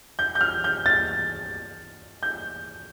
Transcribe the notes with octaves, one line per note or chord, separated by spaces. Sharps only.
G6
G6
F6
G6
A6
G6